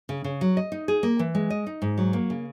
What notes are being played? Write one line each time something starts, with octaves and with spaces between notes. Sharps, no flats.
C#3
C#3
F#3
D#5
D#4
G#4
A#3
E3
G#3
D#5
D#4
G#2
F#3
A#3
C#3